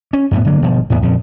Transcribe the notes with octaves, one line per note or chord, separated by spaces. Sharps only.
C#4
F#2 A2 A#3 B3
G1 D3 F#3 A#3
G1 B2 F3
E2 A2 B3
A#1 F2 C#3